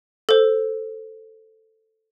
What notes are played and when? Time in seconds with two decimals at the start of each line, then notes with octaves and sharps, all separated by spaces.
0.29 A4 C5